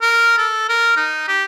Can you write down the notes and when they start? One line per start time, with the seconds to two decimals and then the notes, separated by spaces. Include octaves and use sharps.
0.01 A#4
0.38 A4
0.69 A#4
0.96 D#4
1.28 G4